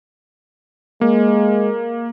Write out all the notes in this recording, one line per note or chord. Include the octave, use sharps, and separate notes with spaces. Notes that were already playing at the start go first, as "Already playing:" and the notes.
G#3 A#3